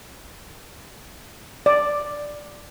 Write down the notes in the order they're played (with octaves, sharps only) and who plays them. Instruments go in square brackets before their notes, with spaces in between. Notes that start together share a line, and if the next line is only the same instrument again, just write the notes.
[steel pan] D5